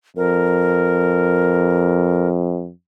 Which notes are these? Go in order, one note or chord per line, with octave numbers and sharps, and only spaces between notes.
F2 A#4